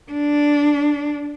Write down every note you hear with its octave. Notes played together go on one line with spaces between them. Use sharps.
D4